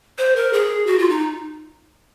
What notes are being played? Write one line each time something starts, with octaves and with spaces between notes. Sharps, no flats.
C5
A#4
G#4
F#4
F4
D#4